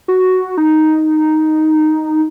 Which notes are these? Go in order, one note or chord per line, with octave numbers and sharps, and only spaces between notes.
F#4
D#4